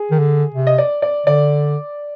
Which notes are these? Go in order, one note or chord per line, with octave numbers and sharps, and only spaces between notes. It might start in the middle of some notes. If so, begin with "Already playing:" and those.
Already playing: G#4
D#3
D3
C3
D#5
D5
D5
D3 D5